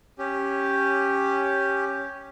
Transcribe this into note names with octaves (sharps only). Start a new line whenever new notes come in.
C#4 G4